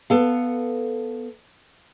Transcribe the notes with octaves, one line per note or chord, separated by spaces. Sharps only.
B3 A4 F5